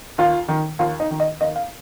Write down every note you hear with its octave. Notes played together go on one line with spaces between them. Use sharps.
D#2 F4
D#3
D#2 F4
D#4
D#3
D#5
D#2 D#5
F5